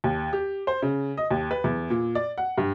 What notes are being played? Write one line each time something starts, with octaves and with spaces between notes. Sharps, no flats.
D#2
G4
C5
C#3
D#5
D#2
B4
E2
A#2
D5
F#5
G2